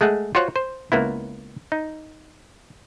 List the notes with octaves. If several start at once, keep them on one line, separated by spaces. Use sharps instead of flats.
G#3 A3 G#4 F#5
F4 F#4 C5 C#5 F#5
C5
C#2 A#3 B3 E4
D#4